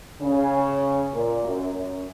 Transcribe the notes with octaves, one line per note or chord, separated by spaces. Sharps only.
C#3
A#2
F#2
F#2